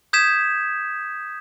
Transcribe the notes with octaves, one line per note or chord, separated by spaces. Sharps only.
D#6 G6 G#6 B6 E7